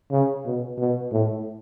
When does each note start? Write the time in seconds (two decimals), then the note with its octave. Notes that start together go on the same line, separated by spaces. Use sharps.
0.11 C#3
0.45 B2
0.78 B2
1.12 A2